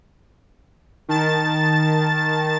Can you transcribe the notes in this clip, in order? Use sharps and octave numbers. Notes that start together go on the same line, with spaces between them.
D#3 A5 A6